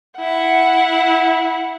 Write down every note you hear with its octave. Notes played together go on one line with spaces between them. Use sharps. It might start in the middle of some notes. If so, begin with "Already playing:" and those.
E4 F#5